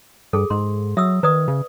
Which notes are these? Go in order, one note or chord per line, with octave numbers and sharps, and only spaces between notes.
G2 G#4 A4
G#2 C6
F#3 E5 D#6 E6
D#3 B4 D5 D#6
C#3